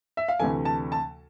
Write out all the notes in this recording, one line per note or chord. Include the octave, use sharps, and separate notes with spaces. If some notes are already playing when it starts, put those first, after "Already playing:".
E5
F5
D2 C3 E3 A3 G#5
A5
A5